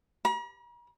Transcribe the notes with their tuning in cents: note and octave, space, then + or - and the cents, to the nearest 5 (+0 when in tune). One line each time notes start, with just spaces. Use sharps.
A#5 +45